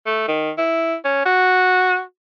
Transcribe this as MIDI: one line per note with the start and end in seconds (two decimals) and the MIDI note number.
0.06 0.28 57
0.28 0.51 51
0.58 0.95 64
1.05 1.20 61
1.26 2.01 66